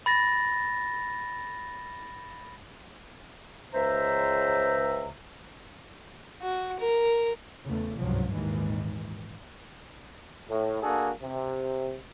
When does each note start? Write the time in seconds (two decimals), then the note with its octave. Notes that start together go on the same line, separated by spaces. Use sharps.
0.06 B5 A6 A#6
3.74 C#2 C5 E5 A#5
6.42 F#4
6.80 A#4
7.65 E2 C#3 A3
7.99 G#1 C#2 G2 C3 F3 F#3
8.33 G#1 D#2 A#2 D#3 E3 G#3
10.47 A2
10.82 A#3 D4 F#4 G#4 A4
11.21 C3